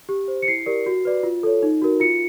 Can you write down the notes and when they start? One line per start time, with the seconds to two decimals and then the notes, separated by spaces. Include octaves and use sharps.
0.09 G4
0.28 C5
0.42 C#7
0.48 E4 C7
0.66 G4 A#4 D5
0.86 F#4
1.05 B4 D5
1.23 F4
1.43 A4 C#5
1.63 D#4
1.82 F#4 A#4
2.00 F4 C#7